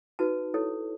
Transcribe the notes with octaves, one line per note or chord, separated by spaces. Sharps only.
D#4 F#4 B4 A5
E4 A4 C#5